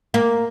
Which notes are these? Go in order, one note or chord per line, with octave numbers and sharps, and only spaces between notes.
A#3